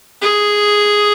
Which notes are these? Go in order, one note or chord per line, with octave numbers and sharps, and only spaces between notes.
G#4